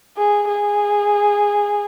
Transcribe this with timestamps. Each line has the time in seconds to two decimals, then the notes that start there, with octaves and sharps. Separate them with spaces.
0.17 G#4
0.48 G#4